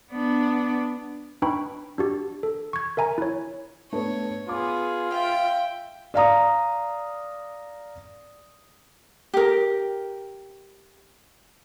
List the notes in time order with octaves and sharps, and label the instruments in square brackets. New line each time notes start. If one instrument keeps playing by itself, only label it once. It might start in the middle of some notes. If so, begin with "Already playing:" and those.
[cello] B3 D4
[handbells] D4 D#4 B4 G5 B5 C#6
D4 F#4 G4
A4
C#6 G#6
A#4 E5 G#5 A#5
E4 C#5
[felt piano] A3 B3 D4 [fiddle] C#5
[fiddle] B3 G#4 [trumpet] F4 [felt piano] D6
[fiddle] E5 G5 [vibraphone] F5
[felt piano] D5 F5 A#5 D#6
[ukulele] G4 A#4